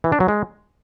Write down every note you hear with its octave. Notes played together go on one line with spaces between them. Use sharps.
E3
D4
F#3
G#3